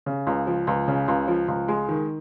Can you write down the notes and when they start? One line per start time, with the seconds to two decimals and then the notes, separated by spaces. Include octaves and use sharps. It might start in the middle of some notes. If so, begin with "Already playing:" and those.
0.06 C#3
0.27 C#2
0.47 F3
0.67 C#2
0.88 C#3
1.08 C#2
1.28 F3
1.48 C#2
1.68 G#3
1.89 D#3